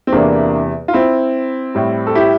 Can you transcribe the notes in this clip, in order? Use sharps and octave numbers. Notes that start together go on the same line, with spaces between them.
C4
E2 C3 E3 A#3 D4
F4
C4 E4
A2 G3
A4
E4 G4